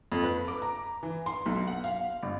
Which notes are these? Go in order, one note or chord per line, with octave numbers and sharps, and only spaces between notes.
F2
B4
D6
A#5
E3
C6
B1
F#5
F5
G1